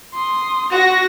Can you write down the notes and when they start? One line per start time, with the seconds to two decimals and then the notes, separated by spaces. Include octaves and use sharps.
0.14 C6 D#6
0.72 F#4 A#6